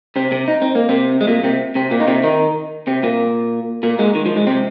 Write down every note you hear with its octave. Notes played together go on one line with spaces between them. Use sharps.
C3 C4
C3 C4
D#4
C4
A#3
C3 C4
G#3
A#2 A#3
C3 C4
C3 C4
A#2 A#3
D#4
C3 C4
D#3 D#4
C3 C4
A#2 A#3
A#2 A#3
G#2 G#3
D#3
F3
G#2 G#3
C3 C4